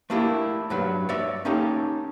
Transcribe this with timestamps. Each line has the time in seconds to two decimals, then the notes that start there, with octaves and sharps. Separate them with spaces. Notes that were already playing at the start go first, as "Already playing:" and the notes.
0.10 A3 A#3 D4 E4 G4
0.70 G2 F#3 B4
1.09 C#5 D5 E5
1.45 A#3 C#4 D#4 G4 A4